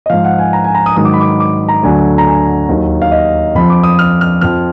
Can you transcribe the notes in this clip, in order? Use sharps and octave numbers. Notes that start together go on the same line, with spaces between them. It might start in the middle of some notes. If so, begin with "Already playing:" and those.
D#5
G#2 F3 F5
F#5
G#5
A#5
G#5
A#5
D#6
G#2 D#3 F#3 D#6
D6
B5
D6
D6
A#5
D2 D3 F#3 G#5
A#5
G#5
D#2 D#3 F#3
F5
D#5
F2 F3 B5
D6
D#6
F6
F6
F2 F3 F6